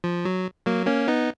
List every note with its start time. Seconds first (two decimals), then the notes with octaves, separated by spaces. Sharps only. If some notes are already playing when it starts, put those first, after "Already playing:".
0.04 F3
0.25 F#3
0.66 F#3 A#3
0.86 A#3 C#4
1.08 B3 D#4